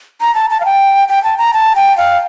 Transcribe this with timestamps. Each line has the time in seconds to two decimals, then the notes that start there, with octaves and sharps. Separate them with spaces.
0.21 A#5
0.35 A5
0.50 A5
0.60 F5
0.65 G5
1.08 G5
1.24 A5
1.38 A#5
1.53 A5
1.76 G5
1.97 F5